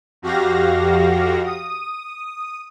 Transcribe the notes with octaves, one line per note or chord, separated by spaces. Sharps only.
F2 F#4 G4 F5 A#6
D#6